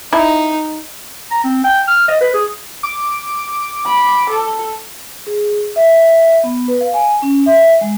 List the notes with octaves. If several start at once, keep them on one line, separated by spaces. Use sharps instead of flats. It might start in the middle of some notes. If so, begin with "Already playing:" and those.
D#4 E4
A#5
C4
G5
F6
D#5
B4
G#4
D6
B5
A4
G#4
E5
B3
B4
F5
G#5
C#4
E5
G#3